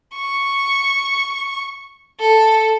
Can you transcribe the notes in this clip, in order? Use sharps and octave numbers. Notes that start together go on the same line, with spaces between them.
C#6
A4